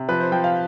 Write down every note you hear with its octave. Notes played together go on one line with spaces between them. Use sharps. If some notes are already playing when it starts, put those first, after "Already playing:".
Already playing: C3
F3 B4
C5
F3 G5
F5